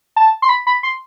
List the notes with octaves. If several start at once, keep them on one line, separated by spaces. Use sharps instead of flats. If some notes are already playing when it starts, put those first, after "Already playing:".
A5
C6
B5
B5
C6